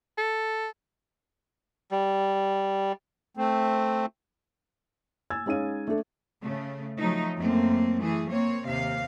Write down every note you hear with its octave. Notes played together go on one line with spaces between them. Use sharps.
A4
G3
A3 C4
G#5 E6 G#6 A6
G#3 C#4 D#4 F5 D#7
A3 D4 A4
C#3 A3
F3 F#3 A3 D#4
F#2 A3 A#3 C4
E3 A3 G#4
A#3 C4 C#5
D#2 C3 F5